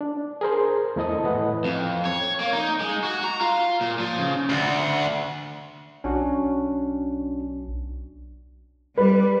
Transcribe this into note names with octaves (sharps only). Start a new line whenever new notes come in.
D4
G#4 A#4 C5
E2 A3 E4 D#5 A5 D#6
A2 E3 B4 D#5 F#5
F2
C#5
A#3
D#4
G#3
F#4
A#5
F4
A#2
F3
C#3
D2
B1 C#4 D4 F#4
G3 B4